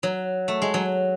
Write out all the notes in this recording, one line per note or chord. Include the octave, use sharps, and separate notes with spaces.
F#3
A3
G#3
F#3